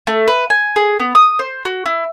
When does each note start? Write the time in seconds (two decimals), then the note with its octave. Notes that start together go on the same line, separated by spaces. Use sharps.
0.07 A3
0.28 B4
0.50 G#5
0.76 G#4
1.00 B3
1.15 D#6
1.39 C5
1.65 F#4
1.86 E4